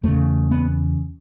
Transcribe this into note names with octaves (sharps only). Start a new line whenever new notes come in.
E2 C#3 A3
B3